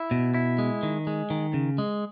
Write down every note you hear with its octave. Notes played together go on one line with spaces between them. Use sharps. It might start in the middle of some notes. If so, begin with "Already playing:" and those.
Already playing: E4
B2
E4
G#3
D#3
G#3
D#3
C#3
G#3